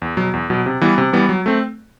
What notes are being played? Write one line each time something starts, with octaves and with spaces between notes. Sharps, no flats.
E2
B2 F#3
E2
B2 F#3
C3
E3 G3 B3
C3
E3 G3 B3
F#3
A3 C4